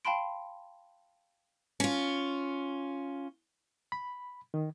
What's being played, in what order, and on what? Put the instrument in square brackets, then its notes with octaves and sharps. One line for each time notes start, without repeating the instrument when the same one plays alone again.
[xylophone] F5 G5 A5 B5 C6 D7
[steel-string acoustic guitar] C#4 F4
[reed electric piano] B5
D#3